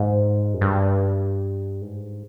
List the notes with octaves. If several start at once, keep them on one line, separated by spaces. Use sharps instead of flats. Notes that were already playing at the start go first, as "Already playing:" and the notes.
Already playing: G#2
F#2
G2
G#2